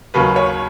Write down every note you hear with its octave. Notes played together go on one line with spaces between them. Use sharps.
D#2 C#3 F#3 B4
C#5